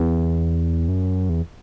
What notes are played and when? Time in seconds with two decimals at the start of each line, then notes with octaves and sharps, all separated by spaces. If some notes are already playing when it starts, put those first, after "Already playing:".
Already playing: E2
0.88 F#2
1.29 E2